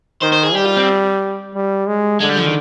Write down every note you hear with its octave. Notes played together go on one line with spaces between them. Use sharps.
D#3 C5
C5
G#4
G3 G4
F4
C4
G3
G#3
D3 G#3
G3
F3
D#3